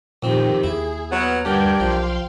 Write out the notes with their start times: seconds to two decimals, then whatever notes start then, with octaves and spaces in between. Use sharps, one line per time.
0.23 F2 A#2 D#3 C4 G4
0.64 D#2 E4 G#4
1.10 F#3 B3 F6
1.45 G2 D3 D4 G4 A#4 D6 G6 G#6
1.80 B1 F3 F5 G5 C6